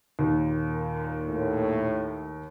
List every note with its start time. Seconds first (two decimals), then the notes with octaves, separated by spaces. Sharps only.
0.19 D#2 A#2
1.28 A2